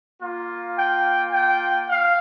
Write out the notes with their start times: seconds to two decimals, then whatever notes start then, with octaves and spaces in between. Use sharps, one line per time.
0.21 A#3 F4
0.77 G5
1.32 G5
1.88 F5